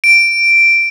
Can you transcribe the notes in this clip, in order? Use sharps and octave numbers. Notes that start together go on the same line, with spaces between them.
D7